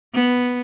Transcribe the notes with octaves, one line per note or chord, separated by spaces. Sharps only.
B3